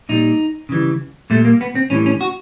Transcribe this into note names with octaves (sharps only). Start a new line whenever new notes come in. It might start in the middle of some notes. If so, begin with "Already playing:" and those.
A#2 G3 D#4
C#3 E3 G3
A#2 G3 A3
A#3
B3
C4
A2 E3 G3 C#4
C#4
F#4